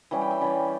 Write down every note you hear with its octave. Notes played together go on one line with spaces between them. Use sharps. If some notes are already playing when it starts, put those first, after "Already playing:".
E3 G3 C#4 F#5
G5
E5
E3 G3 C#4 D5